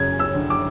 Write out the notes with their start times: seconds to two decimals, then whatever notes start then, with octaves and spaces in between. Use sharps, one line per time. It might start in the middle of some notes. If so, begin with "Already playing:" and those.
Already playing: F#2 C#3 G#6
0.12 C#4
0.19 E6
0.35 D3
0.50 D6